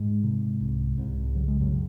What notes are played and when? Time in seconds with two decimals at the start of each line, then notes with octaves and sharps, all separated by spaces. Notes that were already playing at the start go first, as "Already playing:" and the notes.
Already playing: G#2 G#3
0.23 C3
0.60 C2
0.98 C2
1.35 C#3 F#3
1.48 G#3
1.61 F#2 F#3
1.72 C#3